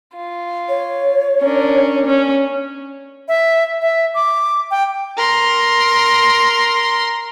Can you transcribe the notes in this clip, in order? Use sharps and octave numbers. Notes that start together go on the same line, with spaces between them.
F4
C#5
C#4 D4 A#4
C#4
E5
E5
D6
G5
A#4 C6